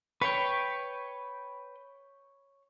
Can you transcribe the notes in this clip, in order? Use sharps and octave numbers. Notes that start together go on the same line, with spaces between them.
B4 C#5 G5 C#6